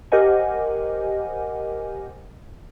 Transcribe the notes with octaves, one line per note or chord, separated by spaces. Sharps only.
G4 A#4 C5 D#5 F#5 G#5